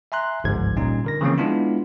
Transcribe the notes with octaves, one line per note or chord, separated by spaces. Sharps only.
E5 G#5 A#5 C6 F#6
G1 C#2 G#2 F3 G#6
A#2 G3 C#4 D#4
D3 A#4 A#6
C#3 E3 F3 A#3 C4 C#4
G#3 B3 D4 E4 F4